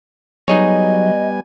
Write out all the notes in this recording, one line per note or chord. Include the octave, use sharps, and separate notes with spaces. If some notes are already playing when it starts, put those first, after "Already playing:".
F#3 G3 B3 D#4 G#4 C#5 D#5 G#5